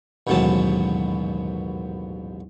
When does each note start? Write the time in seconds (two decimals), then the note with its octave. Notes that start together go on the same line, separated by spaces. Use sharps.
0.27 A1 D#2 G#2 B2 F#3 A5